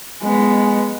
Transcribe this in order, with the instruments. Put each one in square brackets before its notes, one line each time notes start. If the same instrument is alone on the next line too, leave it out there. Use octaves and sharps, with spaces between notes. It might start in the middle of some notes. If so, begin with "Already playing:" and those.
[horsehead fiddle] G#3 B3